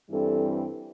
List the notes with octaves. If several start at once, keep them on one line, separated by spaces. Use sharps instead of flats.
G2 E3 G3 C4 A4